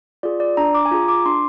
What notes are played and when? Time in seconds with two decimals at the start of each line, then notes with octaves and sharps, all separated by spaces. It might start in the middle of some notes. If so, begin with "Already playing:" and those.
0.23 F4 G#4 D5
0.40 D5
0.57 D4 A#5
0.75 D6
0.85 G#5
0.91 F4 G#4 A#5
1.08 D6
1.26 D4 C6